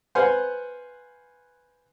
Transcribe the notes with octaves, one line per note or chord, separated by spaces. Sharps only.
B4 C5 F5 F#5 G#5 C6